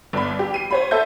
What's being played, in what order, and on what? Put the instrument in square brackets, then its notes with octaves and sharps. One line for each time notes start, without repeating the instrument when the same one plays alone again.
[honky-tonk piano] G1 D5 B5
G4
C7 D#7
C5 C#5 B5
A4 E5 A5 G6